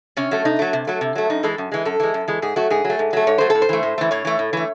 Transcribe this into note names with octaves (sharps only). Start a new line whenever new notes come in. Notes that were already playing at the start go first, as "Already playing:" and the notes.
C3 C#4
F#3 A3
C3 D#4
F#3 A3
C3
F#3 A3
C3
F#3 A3
F#2 D#4
E3 G#3 A4
F#2
E3 G#3
F#2 A4
E3 G#3
F#2
E3 G#3
G#2 G#4
F#3 A3 F#4
G#2 G#4
F#3 A3
G#2
F#3 A3
G#2 C#5
F#3 A3 C5
A2 A4
C5
E3 A3
A2
E3 A3
A2 C#5
E3 A3
A2
E3 A3